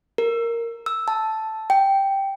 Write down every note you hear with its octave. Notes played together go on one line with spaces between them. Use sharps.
A#4
E6
A5
G5